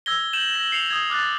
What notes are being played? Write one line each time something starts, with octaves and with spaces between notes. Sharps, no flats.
E6 G#6 A#6 G7
G6 D#7 E7 F#7
A#6 E7 F#7
C7 C#7 F7
D#6 G#6
D6 F6 F#6 G#6 A6